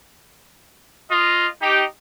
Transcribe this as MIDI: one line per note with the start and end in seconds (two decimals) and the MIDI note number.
1.10 1.46 65
1.10 1.46 75
1.62 1.84 63
1.62 1.84 67